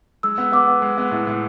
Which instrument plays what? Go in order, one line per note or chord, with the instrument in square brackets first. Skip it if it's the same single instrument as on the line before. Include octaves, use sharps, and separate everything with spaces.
[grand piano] G#3 [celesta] E6
[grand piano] B3
[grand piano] B3 [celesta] D6
[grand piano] B3
G#3
B3
A2
A2